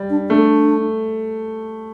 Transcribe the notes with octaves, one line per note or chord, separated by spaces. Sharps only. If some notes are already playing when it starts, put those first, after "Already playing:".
Already playing: G3
D4
A3 D4